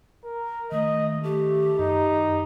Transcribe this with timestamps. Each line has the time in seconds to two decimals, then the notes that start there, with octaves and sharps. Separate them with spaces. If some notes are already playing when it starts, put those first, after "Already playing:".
0.24 A#4
0.72 D#3 A3 D#5
1.23 A3 G4
1.79 F#2 D#4